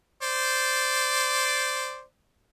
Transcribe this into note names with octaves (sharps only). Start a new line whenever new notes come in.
C5 D5